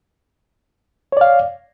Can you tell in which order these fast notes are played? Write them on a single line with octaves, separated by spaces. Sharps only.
C#5 D5 F5